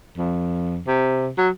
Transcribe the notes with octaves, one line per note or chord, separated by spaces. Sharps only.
F2
C3
F#3